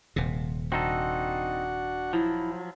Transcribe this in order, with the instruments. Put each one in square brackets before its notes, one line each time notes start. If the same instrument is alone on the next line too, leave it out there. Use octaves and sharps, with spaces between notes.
[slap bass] D#1 C3
[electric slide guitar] C4 D#4 A4 [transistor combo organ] D4 F#4 F#5
[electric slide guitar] F3 F#3 [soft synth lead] E4